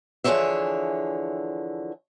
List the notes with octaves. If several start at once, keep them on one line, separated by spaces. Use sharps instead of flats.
D3 E3 F3 G#4 C#5 E5